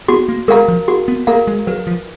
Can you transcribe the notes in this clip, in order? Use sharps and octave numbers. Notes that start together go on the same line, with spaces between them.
B3 F#4
A#3
G#3 A#4 F5 A#5
F3
F#4
B3
A#3 A#4 F5 A#5
G#3
F#3 B4
F3